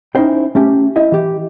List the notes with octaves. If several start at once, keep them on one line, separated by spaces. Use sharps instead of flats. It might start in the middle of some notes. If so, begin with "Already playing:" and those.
C#4 D#4 E4 C5 G5
A3 C#4 G4
E4 D#5 E5
E3 G4